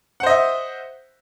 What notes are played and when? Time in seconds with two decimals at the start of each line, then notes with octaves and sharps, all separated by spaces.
0.20 F#5
0.23 C5
0.26 D#5
0.30 E5